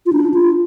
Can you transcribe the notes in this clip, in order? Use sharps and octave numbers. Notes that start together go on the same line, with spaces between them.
F4
D4
F4